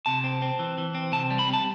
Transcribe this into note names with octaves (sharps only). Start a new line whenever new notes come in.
C3 A5
C4
C4
E3
E3
C4
C3 A5
G3
B5
C4
A5